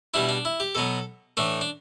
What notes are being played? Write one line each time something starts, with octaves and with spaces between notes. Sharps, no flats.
B2 G3 D4 E4
D4
E4
G4
B2 F#3 B3 A4
A2 E3 A3 D4
D4